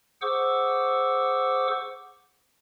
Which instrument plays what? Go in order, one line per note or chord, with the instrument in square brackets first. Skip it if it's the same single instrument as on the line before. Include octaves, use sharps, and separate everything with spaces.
[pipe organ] G#4 C5 F#5 C#6 D6 E6